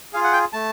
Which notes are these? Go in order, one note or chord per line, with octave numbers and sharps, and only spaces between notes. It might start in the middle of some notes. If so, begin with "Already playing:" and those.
F4 G#4 F5
F#5
G5
A3 A5